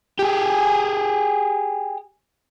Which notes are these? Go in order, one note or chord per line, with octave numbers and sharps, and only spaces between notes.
G4 G#4